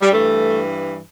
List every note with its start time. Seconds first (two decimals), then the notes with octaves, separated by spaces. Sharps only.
0.01 G3
0.11 G2 E3 A3